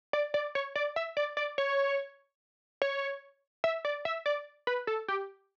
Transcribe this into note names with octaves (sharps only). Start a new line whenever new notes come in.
D5
D5
C#5
D5
E5
D5
D5
C#5
C#5
E5
D5
E5
D5
B4
A4
G4